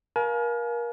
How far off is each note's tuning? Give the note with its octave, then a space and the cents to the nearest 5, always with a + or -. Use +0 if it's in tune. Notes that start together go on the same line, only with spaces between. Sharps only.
A#4 +30 F5 +0 G#5 +40